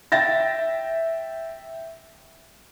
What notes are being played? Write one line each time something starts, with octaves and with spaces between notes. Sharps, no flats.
E5 G5 A6 A#6